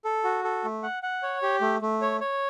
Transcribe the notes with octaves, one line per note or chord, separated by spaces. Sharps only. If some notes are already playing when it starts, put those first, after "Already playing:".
A4
F#4
A4
A3
F#5
F#5
C#5
G4
A3
A3
C#5
C#5